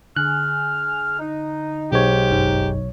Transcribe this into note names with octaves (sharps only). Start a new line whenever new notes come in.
D3 G#4 G#5 F6 F#6
D#4
B1 G#2 G4 C#5
G1 F#2 D#4